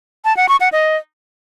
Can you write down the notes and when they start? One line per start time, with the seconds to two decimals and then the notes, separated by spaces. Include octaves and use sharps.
0.25 A5
0.37 F#5
0.49 C#6
0.60 F#5
0.72 D#5